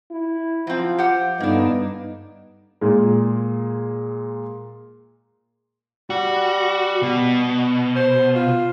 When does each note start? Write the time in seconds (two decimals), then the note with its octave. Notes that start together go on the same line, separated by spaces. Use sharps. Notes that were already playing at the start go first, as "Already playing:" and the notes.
0.11 E4
0.67 F3 F#3 C4
0.98 G4 C5 F#5
1.40 G2 D3 A#3 B3 D4 D#4
2.81 A#2 G#3
6.10 G3 F#4
7.03 B2
7.96 C5
8.35 F4